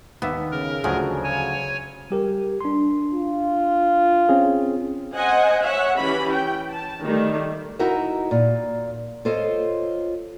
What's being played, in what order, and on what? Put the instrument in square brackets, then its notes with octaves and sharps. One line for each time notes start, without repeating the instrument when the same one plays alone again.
[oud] D#2 [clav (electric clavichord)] B3 E5
[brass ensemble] C#3 [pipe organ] A#4
[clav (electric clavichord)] D2 F3 F#3 [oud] G#4
[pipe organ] C#5 G#5
[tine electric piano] G3 G4 A#4
D4 C6
[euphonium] F4
[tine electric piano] C4 C#4 G#4
[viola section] C5 D#5 F#5 G#5
C#5 E5 F#5
E3 C#4 G4 B5
G5
A5
D#3 G3 A3
[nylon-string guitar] D#4 E4 F#4 A#4 D#5 E5
A#2
F4 A4 C5 C#5 D#5